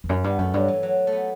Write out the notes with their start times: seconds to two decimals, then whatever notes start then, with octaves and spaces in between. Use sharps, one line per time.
0.04 E2
0.09 F#2
0.24 G2 B3
0.38 F#2 A3
0.54 G2 F#3
0.68 E3
0.83 F#3
1.07 A3
1.12 B3